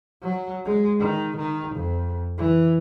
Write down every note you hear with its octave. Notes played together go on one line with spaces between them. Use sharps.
F#3
G#3
D#3
D#3
F2
E3